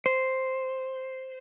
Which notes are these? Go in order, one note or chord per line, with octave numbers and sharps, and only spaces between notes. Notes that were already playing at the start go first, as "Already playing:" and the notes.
C5